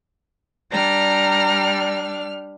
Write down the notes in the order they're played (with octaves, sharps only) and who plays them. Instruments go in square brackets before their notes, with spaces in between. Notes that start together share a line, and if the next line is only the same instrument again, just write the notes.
[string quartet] G3 F6 [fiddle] D4 [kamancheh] A#5